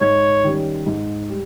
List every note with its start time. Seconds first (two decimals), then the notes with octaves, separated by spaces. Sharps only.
0.01 G#2 C#5
0.44 D#3 G3 C#4
0.86 G#2
1.30 G3